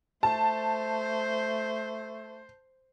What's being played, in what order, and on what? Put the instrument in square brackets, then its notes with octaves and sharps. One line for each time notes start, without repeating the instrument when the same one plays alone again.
[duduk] A3 [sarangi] C5 [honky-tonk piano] A5